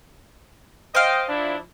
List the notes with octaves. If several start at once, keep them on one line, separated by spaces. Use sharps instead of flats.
C5 D#5 F5 G5
F3 D4 E4